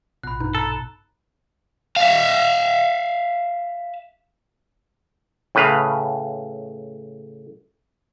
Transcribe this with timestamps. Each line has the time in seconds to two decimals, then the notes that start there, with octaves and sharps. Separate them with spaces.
0.23 A#1 B2 B5 F#6
0.40 G2 D#4
0.55 A4 A#5
1.96 E5 F5
5.55 A2 C#3 B4 F5